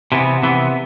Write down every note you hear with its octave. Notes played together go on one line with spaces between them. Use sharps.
C3 E3 B3
C3 E3 B3